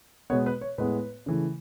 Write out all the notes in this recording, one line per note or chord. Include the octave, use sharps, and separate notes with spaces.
B2 G#3 B3 C#5
B4
C#5
A2 G#3 B3 B4
C#3 E3 A3